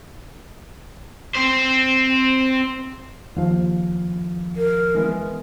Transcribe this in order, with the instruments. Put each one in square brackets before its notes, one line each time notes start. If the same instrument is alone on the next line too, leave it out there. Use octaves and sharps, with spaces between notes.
[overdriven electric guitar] C4 C5
[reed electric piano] D#2 F3 [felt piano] F5
[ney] A#4
[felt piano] E3 G#3 B3